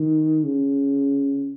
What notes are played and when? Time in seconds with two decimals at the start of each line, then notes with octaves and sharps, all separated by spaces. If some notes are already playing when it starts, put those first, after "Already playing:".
Already playing: D#3
0.44 C#3